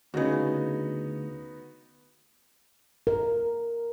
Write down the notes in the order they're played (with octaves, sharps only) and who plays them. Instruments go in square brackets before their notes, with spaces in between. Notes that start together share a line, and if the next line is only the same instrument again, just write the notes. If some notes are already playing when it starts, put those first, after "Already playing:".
[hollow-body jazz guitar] D2 C#3 [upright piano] B3 D#4 F#4
[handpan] A#4